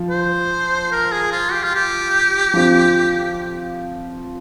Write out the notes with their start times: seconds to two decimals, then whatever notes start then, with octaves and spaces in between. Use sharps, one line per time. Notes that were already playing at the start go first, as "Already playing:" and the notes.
Already playing: F3
0.10 C5
0.92 A#4
1.12 G#4
1.32 F4
1.53 G4
1.63 F4
1.75 G4
2.54 F3 C4 F4